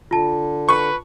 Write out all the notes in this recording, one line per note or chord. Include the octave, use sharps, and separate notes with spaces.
D3 F4 A5
B4 C#6